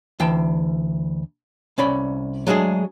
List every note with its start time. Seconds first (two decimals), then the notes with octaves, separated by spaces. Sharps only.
0.20 D2 E3 G5 A5
1.78 C2 C#4 D5 B5
2.47 F#3 G#3 A3 D4 G#4